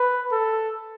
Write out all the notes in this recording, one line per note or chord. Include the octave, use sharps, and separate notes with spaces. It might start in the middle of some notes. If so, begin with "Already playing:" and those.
Already playing: B4
A4